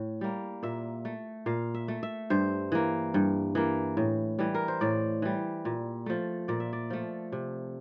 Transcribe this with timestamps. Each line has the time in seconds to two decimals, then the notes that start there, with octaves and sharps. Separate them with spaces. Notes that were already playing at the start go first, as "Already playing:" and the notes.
Already playing: A2
0.21 G3 A#3
0.63 A#2 E5
1.05 A3
1.46 A#2 F5
1.74 E5
1.88 A3
2.03 E5
2.30 G2 C5
2.72 E3 A#3
3.14 G2
3.55 E3 A#3
3.97 A2
4.39 E3 G3
4.54 A#4
4.68 C5
4.81 A2 D5
5.22 E3 G3
5.65 A#2
6.06 F3 A3
6.48 A#2 D5
6.60 E5
6.73 D5
6.90 F3 A3
7.32 C3